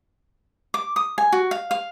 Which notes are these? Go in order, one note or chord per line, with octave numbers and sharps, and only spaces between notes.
D6
D#6
G#5
F#4
F5
F5